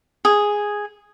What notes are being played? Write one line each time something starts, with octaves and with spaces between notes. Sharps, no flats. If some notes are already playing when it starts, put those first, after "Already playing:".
G#4